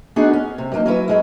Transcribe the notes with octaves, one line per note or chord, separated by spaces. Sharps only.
B3 D4 D#4 F#4 G#4
C#4
C3
G2 F#3 A3 A#3 D#4
F#3 C#4 E4 B4
F#2 G#3 E4